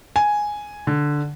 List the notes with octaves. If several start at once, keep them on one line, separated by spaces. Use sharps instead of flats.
G#5
D3